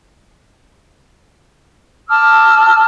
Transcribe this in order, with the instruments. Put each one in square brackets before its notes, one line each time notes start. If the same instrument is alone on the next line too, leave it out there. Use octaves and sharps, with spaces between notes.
[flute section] A5 D6 E6 F6